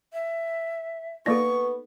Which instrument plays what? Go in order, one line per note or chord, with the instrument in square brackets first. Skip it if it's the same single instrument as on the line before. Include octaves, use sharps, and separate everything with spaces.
[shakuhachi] E5
[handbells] A#3 D5 A#6 [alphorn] B3 [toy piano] D#4 A4 [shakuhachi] C#6